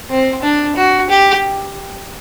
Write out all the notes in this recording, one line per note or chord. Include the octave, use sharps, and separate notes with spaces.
C4
D4
F#4
G4